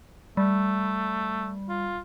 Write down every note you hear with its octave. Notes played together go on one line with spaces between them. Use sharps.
G3 A3
F4